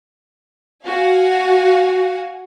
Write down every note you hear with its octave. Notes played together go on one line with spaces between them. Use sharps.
F#4 F5 F#5 G#5